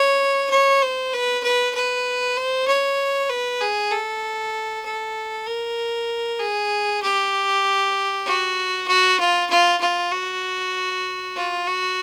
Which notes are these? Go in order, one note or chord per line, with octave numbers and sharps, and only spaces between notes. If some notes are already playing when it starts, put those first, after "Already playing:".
Already playing: C#5
C#5
C5
B4
B4
B4
C5
C#5
B4
G#4
A4
A4
A#4
G#4
G4
F#4
F#4
F4
F4
F4
F#4
F4
F#4